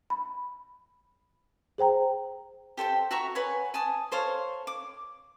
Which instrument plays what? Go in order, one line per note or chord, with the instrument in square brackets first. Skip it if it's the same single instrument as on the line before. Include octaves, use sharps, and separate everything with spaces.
[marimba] B5
G#4 C5 G5 A#5
[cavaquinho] G4 A4 C5 G5
F#4 E5 A#5 C#6
B4 C#5 F#5 G#5
G#5 A5 D#6
A4 C5 C#5 F5
D6